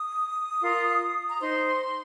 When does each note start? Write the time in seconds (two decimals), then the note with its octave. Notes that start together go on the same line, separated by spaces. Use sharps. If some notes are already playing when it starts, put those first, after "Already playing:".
Already playing: D#6
0.59 F4 A#4
1.30 A#5
1.40 D#4 C5 C6